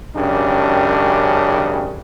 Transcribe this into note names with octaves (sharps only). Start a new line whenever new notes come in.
G#1 F#2 C#3 D4 G4